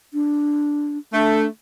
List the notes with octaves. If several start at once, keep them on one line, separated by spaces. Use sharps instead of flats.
D4
A3 D4